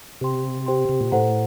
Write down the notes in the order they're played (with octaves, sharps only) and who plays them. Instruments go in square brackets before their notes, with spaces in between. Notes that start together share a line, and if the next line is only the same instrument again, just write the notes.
[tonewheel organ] C3 [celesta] G4 C5 G5 C6
[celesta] G4 C5 G5 C6
[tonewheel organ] C3
A#2
[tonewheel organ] A2 [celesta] A4 C5 F#5 A#5